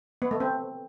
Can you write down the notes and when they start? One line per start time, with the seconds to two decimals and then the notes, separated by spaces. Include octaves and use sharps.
0.22 B3
0.31 A3
0.40 C4